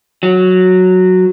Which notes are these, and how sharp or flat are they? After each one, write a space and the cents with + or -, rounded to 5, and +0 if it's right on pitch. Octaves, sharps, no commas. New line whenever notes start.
F#3 -5